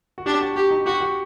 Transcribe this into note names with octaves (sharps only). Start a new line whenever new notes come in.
F#4
D4 G4
F#4
F#4 G4
D#4
F#4 G4
F#4